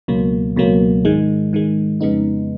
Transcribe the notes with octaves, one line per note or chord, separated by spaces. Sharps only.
C#2 B2 F#3 A#3
C#2 B2 F#3 A#3
G#2 D#3 G#3
G#2 D#3 G#3
F2 C#3 G#3 B3 D#4